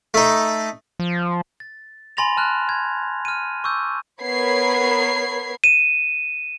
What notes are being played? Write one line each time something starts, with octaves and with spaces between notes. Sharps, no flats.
A3 D#4
F3
A6
G#5 B5 C6 A6 A#6 F7
A5 F6 F#6
G#6
F6 D#7
C#6 D6 E6 G6
B3 A#4 C#5 B5 G#6 C7
D#7 E7